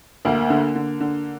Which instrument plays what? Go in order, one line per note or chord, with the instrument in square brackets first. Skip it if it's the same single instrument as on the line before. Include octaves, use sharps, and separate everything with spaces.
[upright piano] D2 [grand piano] A#3
[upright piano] D3
D3
D3